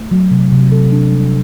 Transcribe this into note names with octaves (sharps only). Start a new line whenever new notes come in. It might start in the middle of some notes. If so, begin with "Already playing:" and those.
Already playing: A3
F#3
C3
C3
A4
D4
G3